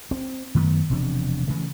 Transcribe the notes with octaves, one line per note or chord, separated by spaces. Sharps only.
C4
F#2 D#3 A3 B3
E1 C3 F3 D4
C#3 E3 A3